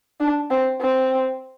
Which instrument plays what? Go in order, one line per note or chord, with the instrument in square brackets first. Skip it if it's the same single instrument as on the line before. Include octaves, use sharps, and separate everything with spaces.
[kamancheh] D4
C4
C4